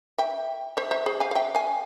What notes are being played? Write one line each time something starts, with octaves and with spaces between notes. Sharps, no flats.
E5 G5
C5 E5
C5 E5
G#4 C5
F5 G#5
F5
E5 G5
F5 G#5